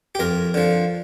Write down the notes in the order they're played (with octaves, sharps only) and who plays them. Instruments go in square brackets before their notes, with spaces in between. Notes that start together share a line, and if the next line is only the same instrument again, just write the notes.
[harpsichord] G4
F2 A#4
D3 F3